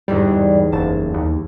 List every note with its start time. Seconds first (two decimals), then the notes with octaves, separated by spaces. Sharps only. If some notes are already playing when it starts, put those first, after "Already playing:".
0.08 G1 E2 G#2 G3
0.72 F#1 A5
1.14 D#2